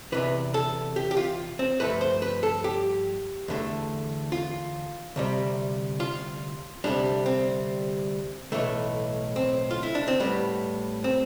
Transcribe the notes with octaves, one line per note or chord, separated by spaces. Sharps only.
E2 C3 E3 B4
A4
G4
G4
F4
C4
G2 F3 A3 B4
C5
B4
A4
G4
E2 D3 A3
F4
D2 C3 G3
F4
D2 C3 G3 D4
C4
B1 A2 E3 A3
C4
F4
E4
D4
C4
A2 G3 B3
C4